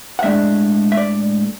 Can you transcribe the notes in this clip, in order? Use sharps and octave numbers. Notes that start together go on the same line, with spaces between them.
F#5
A2 G#3 D4 E5
E5
D5